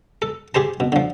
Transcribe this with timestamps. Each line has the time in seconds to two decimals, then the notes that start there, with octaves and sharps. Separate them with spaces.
0.22 A4
0.55 G4 G#4 C5 A5
0.80 B2
0.92 D3 F3